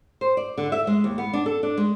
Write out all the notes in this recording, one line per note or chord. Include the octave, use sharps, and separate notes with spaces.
C5
D5
D3
E5
G#3
D#2
B3
D4
A4
D4
G#3